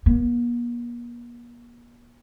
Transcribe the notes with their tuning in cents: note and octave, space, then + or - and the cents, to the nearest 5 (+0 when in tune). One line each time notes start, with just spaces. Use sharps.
A#3 +45